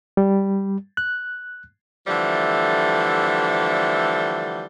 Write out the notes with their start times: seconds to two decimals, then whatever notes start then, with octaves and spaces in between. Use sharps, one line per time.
0.17 G3
0.97 F#6
2.07 D3 E3 F3 G3 A3